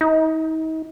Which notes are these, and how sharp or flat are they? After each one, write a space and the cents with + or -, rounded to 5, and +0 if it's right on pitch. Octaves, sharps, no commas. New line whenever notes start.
D#4 +40